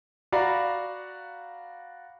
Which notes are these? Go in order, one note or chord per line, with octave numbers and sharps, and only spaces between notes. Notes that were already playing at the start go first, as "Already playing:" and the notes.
F#4 D5 F5 F#5 A#5 B5